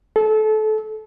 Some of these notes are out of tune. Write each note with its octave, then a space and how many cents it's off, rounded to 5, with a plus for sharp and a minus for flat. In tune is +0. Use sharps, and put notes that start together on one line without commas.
A4 -25